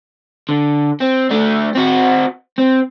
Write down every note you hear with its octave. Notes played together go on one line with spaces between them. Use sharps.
D3
C4
A3 D4
C4 F#4
C4